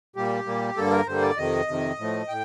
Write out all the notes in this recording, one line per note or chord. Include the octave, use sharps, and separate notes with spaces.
A#2 G3 A#3 G4
A#2 G3 A#3
G2 D3 G3 A#3 A4
A#4
G2 D3 G3 A#3 C5
D5
F2 C3 D#3 D#5
F2 C3 D#3
A2 F3 A3
A2 G5